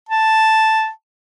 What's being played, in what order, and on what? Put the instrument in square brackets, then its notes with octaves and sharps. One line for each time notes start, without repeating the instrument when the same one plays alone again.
[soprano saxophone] A5